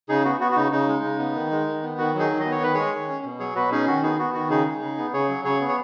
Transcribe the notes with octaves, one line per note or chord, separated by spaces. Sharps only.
C#3 D#4 G#4
B3 F#4
B3 F#4
F#4
C#3 D#4
C#3 D#4
G#3
C#3
B3
D#3
G#3
D#3
B3
D#3 F#4
F#3
D#4 G#4
D#3
D#5
B3
C#5
D#3 B4
G#3 G#4 C#5
D#3
C#4
B2
F#3 G#4 C#5
B2 F#4 B4
C#4 D#4 G#4
D#3 F#4
B3 D#4 G#4
B3 F#4
D#3 F#4
C#3 D#4 G#4
G#3
C#3
B3
C#3 G#4 C#5
F#3
C#3 G#4 C#5
B3
C#5